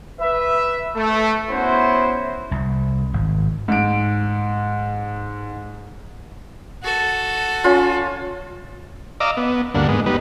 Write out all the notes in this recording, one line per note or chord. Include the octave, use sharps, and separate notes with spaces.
B4 E5
A3
B3 C#4 E4 F#4 C5
C2
G#1
G#2 D7
F#4 A4
C#4 F4
D5 D#5 F5 A#5 D6 E6
B3
D2 G2 A#3 D4 F#5
G#2 G#3 B3
G3 B3 D#4 B4